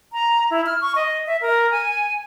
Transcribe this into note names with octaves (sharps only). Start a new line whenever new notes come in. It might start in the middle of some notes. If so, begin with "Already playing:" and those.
A#5
E4
F6
C#6
D#5
E5
A#4
G#5